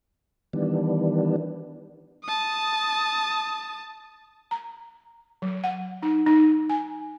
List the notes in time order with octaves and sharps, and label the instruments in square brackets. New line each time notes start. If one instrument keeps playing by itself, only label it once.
[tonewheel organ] D#3 E3 G3 B3 D4
[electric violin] A5 D#6
[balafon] A#5
F#3
F#5
D#4
D#4
G#5